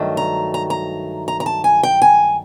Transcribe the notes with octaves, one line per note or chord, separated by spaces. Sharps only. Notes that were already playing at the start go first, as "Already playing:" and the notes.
Already playing: G2 D#3 F#3 A3
A#5
A#5
A#5
A#5
A#5
A5
G#5
G5
G#5